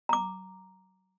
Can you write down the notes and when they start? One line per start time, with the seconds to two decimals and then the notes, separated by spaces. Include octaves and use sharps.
0.09 A#5 D6